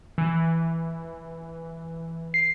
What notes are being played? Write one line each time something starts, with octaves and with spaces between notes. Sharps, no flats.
E3
C7